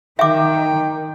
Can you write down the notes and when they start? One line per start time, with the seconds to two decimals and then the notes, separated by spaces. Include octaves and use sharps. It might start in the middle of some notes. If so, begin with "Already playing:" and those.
0.19 D#3 E5 G5 D6